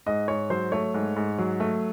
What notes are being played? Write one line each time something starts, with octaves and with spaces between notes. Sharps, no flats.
G#2 D#5
G#2 C#5
F#3 C5
A3 C#5
G#2
G#2
F#3
A3